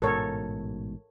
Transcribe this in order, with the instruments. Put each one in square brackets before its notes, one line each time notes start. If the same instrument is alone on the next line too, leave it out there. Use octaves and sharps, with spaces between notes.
[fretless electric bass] A1 G#2 B2 [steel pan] A4 A#4 C#5